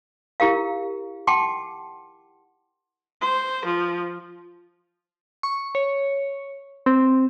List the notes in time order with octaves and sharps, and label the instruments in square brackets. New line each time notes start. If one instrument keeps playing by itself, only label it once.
[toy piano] E4 G4 A#4 F5
F#5 G5 A5 C6 D6
[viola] C5
F3
[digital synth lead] C#6
C#5
C4